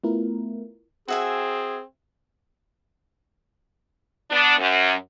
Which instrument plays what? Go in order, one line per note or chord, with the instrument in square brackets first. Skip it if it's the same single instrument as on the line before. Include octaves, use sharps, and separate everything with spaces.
[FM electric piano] A3 B3 E4 F4 A#4
[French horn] C4 [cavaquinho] F#4 E5 G#5 [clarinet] G#4
[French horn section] B3 D4
F#2